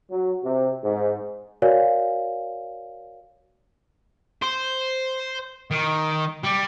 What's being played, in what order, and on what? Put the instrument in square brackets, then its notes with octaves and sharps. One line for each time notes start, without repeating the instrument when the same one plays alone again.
[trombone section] F#3
C3
G#2
[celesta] F#4 A#4 C#5 D5 F5 G#5
[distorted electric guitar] C5
D#3
G3